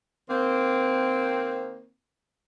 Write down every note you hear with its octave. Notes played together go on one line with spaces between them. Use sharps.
D#3 A#3 C4